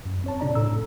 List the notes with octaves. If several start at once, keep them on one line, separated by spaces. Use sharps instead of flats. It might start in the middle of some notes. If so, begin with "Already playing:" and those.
F#2
C4 C#5 A5
A#2 C#3 D4 D5 A#5
A2 A4 A#5 E6